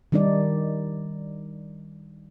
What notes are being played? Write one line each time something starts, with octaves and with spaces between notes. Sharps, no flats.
D#3 G3 D4 D#4 D5